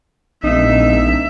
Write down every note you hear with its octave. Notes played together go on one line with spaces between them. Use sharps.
D1 A#1 D#4 E5